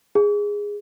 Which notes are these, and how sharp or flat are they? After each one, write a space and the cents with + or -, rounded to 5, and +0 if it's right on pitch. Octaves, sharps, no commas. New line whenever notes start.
G#4 -10